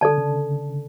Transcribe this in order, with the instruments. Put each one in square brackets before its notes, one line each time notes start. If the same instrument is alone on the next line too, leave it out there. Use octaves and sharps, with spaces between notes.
[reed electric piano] D3 [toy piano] A4 D5 A5
[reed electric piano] C#3